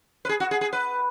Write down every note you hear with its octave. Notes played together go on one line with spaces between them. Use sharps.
B4
G#4
F#4
G#4
G#4
B4